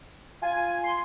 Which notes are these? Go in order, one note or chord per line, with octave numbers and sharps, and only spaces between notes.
F4 G#5
C6